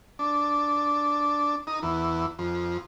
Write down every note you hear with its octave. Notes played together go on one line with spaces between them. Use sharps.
D4
D#4
E2
F2